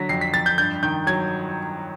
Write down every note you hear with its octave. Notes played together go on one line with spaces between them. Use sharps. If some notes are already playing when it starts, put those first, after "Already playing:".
Already playing: D3 F#3 A#6 B6
F2 C7
B6
F2 A6
G6
G2 G6
D#3 G6
F#3 G#6